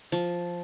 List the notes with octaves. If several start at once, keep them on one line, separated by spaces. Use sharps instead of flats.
F3